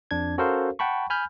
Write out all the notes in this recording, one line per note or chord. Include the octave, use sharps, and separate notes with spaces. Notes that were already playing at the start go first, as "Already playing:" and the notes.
F2 D4 G#6
C#4 F#4 A4 A#4 C5 F5
F#5 G5 A5 B5 C#6
G#5 B5 F6 G6